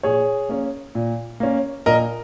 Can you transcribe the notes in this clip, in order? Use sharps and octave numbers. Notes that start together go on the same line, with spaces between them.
A#2 G#4 C#5
A#3 C#4
A#2
A#3 C#4
A#2 A#4 D#5